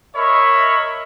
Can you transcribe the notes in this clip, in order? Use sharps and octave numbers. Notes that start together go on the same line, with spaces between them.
A#4 C#5 D#5 E5 B5